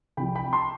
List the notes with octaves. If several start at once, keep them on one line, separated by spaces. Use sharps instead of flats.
C2 C3 F3 G5 B5
G5 B5
A5 C6